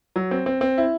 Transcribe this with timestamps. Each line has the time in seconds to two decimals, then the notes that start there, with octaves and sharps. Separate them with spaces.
0.16 F#3
0.31 C4
0.46 C4
0.61 C4
0.78 E4